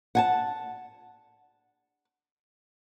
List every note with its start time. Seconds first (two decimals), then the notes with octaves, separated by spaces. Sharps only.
0.15 F#5 G#5 A5